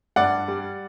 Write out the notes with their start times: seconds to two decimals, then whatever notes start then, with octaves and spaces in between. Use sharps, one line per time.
0.16 G2 D5 F#5
0.48 G3